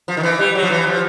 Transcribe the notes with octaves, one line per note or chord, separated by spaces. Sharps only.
F3
D#3
E3
G3
F#3
F3
E3
F3